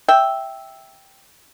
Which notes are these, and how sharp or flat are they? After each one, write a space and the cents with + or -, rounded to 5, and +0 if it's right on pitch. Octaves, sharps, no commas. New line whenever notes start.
E5 +0 G5 +0